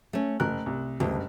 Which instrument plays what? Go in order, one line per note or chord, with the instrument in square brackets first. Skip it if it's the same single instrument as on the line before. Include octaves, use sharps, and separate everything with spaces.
[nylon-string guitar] A3 C#4
[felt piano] F#1 F#6 [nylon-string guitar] A#4
[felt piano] C2
[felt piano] F#1 G2 [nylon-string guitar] D2